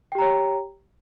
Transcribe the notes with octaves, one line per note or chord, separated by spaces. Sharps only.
G4 C#5 G5 A#5